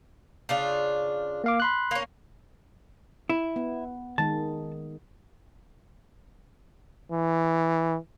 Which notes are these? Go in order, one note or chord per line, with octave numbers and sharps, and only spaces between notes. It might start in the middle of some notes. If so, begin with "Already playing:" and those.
C#3 D4 F4
A#3 F5 D6
B5 C6 F#6
A#3 C#4
E4
B3
D#3 G#3 A5
E3